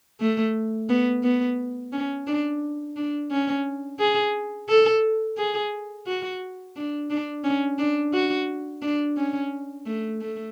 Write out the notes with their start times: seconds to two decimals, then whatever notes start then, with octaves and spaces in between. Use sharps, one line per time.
0.21 A3
0.89 B3
1.23 B3
1.93 C#4
2.27 D4
2.96 D4
3.31 C#4
3.99 G#4
4.69 A4
5.38 G#4
6.07 F#4
6.76 D4
7.10 D4
7.44 C#4
7.79 D4
8.14 F#4
8.82 D4
9.17 C#4
9.86 A3
10.21 A3